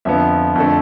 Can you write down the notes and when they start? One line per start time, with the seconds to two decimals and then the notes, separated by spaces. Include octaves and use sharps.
0.05 F2 D3 F3 B3 E5
0.56 F2 D3 A3